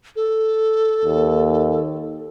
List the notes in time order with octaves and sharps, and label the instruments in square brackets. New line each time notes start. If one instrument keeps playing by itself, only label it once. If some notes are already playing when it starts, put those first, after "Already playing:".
[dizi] A4
[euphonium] D#2